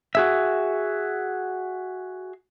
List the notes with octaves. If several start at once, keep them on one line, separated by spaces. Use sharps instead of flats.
F#4 G#4 E5